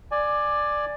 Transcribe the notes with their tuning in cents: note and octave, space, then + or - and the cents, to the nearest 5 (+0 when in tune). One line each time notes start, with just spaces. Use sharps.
D5 +10 G#5 +5